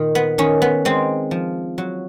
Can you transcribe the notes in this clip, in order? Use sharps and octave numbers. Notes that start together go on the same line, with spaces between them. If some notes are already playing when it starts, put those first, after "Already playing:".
Already playing: A#2 D#3
B3
D#3 C#4
B3
G#3 C4
F3
F#3